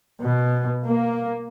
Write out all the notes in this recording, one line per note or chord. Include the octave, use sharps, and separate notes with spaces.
B2
A#3